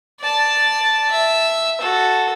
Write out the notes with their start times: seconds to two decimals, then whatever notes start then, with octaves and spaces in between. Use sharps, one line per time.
0.20 D5 A5
1.11 E5
1.81 F#4 A4